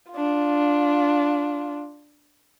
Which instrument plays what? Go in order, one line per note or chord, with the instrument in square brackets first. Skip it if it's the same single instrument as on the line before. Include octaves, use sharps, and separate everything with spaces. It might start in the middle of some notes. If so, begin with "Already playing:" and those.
[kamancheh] D4 F4